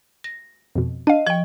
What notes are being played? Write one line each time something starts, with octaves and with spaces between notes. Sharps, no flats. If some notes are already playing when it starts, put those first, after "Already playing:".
A#6
F2 B2
D4 D#5 F5
F3 G5 C#6